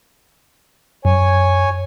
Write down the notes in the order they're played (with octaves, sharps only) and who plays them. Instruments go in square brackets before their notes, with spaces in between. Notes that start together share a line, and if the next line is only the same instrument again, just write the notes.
[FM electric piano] F#2 [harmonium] C#5 G#5